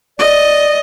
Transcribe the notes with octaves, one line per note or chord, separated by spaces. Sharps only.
D5 D#5